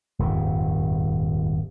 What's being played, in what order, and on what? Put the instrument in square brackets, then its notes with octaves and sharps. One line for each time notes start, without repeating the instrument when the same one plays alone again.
[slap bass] D#1 F2 G#2